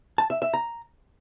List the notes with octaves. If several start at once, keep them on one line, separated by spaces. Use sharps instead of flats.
A5
E5
E5
A#5